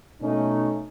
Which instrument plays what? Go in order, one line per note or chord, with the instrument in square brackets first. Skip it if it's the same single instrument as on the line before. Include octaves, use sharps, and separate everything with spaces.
[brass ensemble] B2 A3 C#4 D#4